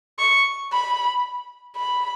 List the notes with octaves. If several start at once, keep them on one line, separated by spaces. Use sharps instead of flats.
C#6
B5
B5